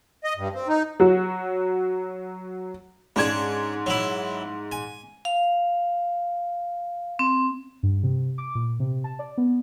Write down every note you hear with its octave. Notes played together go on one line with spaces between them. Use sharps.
D#5
G2
C4
D#4
F#3 F#4
G#2 C#4 D4 G#4 G#6
F#3 E4
G#5
F5
C4
G2
C3
D6
A#2
C3
A5
D5
B3